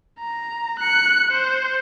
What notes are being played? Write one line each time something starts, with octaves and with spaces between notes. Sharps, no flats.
A#5
F#6 C#7
C5